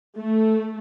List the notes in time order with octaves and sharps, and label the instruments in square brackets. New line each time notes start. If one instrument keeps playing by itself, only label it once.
[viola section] A3